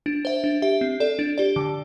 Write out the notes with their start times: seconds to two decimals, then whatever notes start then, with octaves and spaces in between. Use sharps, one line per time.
0.06 D4
0.25 C5 E5
0.44 D4
0.62 G4 E5
0.81 C4
1.00 A4 D5
1.19 D4
1.38 G4 D5
1.56 D3